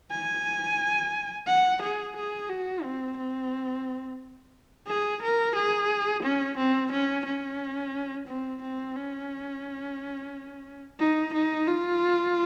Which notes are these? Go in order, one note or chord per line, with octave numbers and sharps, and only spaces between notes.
G#5
F#5
G#4
G#4
F#4
C4
C4
G#4
A#4
G#4
C#4
C4
C#4
C#4
C4
C4
C#4
D#4
D#4
F4